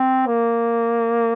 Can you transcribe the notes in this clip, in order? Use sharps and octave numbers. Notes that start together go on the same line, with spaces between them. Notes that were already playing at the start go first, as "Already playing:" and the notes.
Already playing: C4
A#3